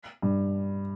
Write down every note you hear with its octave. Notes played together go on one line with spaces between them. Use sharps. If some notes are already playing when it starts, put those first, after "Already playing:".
G2